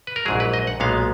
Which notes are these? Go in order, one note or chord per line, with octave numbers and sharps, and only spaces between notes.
B4
A#4
A#1 G#2 F#3 G#4
B4
D#5
F#5
B1 A#2 G#3 B3 F5